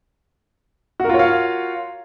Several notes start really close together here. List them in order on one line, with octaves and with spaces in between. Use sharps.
F#4 A#4 F4 C#5 F5